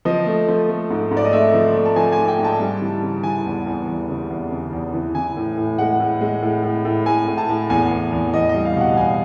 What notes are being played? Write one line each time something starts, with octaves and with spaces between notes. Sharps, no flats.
F3 D#5
A3
F3
A3
G#2
G#2
D5
D#5
A3 E5
F3
A3
A5
F3 G#5
G#5
G#2
G5
G#2
A5
G3
E3
C#3
E3 G#5
E2
E2
E2
C#3
E2
C#3
E2
E3
E3 G#5
A2
A2
G#3 F#5
A2
G#3
A2
A2
A2
A2 G#5
A2
A5
A2
E2 G#5
E2
E2
E2 D#5
D#5
G3
F5
B2 F#5
E2 G#5